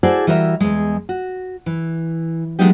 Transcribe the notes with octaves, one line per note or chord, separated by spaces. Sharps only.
E4 F#4 G#4 A4 C5 D5
E3 G3 F#4 A#4 C#5 E5
E2 G#3
F#4
E3
F#3 G#3 A3 B3 D#4 G4